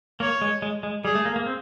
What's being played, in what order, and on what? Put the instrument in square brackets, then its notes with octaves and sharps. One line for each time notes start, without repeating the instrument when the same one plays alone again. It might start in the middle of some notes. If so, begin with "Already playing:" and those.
[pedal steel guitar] A#3 [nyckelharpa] C#5
[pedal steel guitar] G#3
G#3
G#3
[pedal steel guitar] G3 [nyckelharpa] G#4
[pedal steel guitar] A3
A#3
A#3
C4